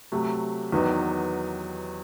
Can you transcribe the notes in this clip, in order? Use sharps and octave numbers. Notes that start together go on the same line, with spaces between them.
C3 F#3 A3
E2 D#3 F#3 B3 D#4